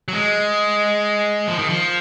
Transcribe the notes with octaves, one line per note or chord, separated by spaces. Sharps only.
F#3
G#3
F3
D#3
F3